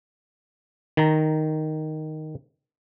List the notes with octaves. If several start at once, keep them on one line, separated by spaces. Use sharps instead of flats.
D#3 A#5